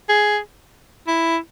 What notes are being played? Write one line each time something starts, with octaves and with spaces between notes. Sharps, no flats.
G#4
E4